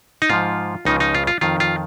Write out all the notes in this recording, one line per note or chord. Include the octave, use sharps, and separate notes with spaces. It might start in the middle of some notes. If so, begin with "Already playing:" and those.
D#4
G#2 F3 F4
C#2 C#3 F3 D#4
D#4
F4
F4
F2 D#3 F4
F4